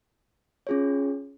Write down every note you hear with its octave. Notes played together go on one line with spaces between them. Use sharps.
C#4 F4 G#4 C#5